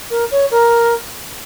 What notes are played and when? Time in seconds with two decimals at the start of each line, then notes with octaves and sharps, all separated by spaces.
0.10 A#4
0.31 C#5
0.51 A#4